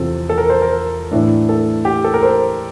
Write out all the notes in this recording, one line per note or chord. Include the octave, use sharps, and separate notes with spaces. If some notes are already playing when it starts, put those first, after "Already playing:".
Already playing: E2 C3 F3 C4 A4
A4
A#4
C5
A#4
A2 E3 A3 D4
A4
G4
A4
A#4
C5